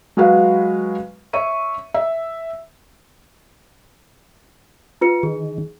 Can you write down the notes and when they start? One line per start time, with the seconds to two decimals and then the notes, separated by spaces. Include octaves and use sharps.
0.17 F#3 G#3 F#4 B4 F5
1.33 C#5 E5 C#6 D#7
1.94 E5
5.01 F4 B4 C#7
5.23 D#3 G#4